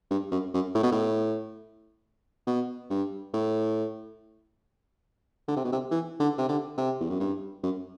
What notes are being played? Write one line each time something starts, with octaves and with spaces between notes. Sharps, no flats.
G2
F#2
F#2
A2
B2
A2
B2
G2
A2
D3
C3
B2
C3
E3
D3
C3
D3
C3
E2
F#2
G2
F#2